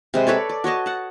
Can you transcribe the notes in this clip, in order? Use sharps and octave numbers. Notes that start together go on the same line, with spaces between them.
C3 G#3 B4
A4 B4 C#5 D5
D5
F#4 C#5 D#5 A5
F#5 A5